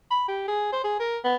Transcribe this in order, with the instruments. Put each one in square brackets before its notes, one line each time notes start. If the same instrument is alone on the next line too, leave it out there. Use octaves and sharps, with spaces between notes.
[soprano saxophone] B5
G4
G#4
C5
G#4
A#4
B3